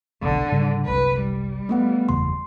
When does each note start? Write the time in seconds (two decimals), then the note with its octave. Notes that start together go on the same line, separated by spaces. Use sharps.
0.22 F1 B1 D3
0.52 G#2 C#3 G3
0.85 F#1 C2 B4
1.21 G3
1.69 A3 B3 F#5
2.09 F#1 E2 C#3 C6